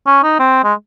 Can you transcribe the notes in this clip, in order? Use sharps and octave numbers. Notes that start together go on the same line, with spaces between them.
C#4
D#4
C4
G#3